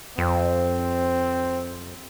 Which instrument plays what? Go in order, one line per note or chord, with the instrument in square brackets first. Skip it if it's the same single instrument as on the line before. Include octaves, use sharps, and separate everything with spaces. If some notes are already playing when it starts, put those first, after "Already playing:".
[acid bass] F2 [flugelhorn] C4